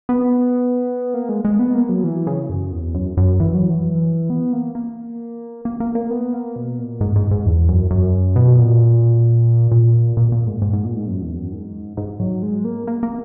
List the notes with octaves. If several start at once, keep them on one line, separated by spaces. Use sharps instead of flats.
B3
A#3
G#3
G#3
B3
A#3
F#3
E3
C#3
F#2
E2
F#2
F#2
E3
F#3
E3
B3
A#3
A#3
A#3
A#3
A#3
B3
A#3
B2
A#2
G#2
G#2
G#2
E2
F#2
F#2
B2
A#2
A#2
A#2
A#2
G#2
G#2
G#2
A#2
G#2
F#2
E2
F#2
G#2
G#2
F#3
G#3
A#3
A#3
A#3